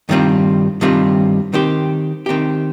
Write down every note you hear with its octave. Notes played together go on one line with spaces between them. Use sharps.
G2 D#3 G3 C4 F4
G2 D#3 G3 C4 F4
D#3 C4 G4
D#3 C4 G4